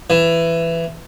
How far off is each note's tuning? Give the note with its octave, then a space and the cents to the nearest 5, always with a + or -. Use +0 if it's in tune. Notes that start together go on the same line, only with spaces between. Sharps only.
E3 +15